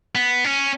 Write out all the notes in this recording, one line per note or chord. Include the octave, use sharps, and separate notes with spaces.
B3
C#4